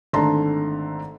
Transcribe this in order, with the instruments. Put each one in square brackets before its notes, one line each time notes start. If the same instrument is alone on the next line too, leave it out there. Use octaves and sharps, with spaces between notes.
[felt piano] G#1 D3 A3 A5 A#5 C6